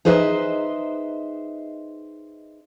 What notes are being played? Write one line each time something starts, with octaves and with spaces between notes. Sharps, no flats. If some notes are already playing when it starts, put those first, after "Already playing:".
D#4 G#4 B4 C5 D#5 E5